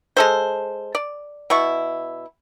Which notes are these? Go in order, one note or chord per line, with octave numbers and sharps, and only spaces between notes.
G#3 A4 C5
D5
B2 E4 C#6